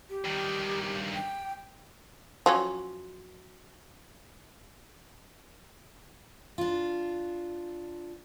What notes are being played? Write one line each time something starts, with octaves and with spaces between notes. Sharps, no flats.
G4
G2 D#3
G5
F3 F#3 C#4
D4 F4